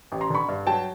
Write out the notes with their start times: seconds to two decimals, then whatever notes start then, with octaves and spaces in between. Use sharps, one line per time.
0.12 A1
0.21 A#5 C6
0.30 D3 B5 C#6
0.49 G2
0.67 F#3 G5 A5